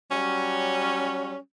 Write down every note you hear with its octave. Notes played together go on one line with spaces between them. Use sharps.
F#3 G3 C#4